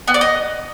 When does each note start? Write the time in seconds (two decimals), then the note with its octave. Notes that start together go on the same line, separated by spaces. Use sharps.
0.08 B3
0.14 D5
0.21 D#5